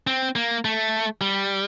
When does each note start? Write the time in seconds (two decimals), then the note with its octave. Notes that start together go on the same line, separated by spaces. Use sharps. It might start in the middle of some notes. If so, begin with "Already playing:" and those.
0.07 C4
0.36 A#3
0.65 A3
1.21 G3